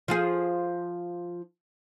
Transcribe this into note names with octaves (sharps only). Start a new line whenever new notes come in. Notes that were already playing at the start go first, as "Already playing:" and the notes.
F3 F4 G#4